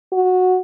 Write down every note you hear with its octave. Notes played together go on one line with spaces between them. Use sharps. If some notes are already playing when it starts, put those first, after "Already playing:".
F#4